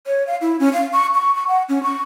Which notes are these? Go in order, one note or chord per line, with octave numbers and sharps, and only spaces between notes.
C#5
F5
E4
C#4
F5
C#6
C#6
C#6
F#5
C#4
C#6